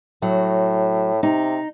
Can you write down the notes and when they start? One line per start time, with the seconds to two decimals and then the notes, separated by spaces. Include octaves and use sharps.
0.22 A2 F#3
1.23 C3 D#4